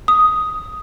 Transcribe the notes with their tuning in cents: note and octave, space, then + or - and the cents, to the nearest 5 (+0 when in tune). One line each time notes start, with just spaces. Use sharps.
D#6 +5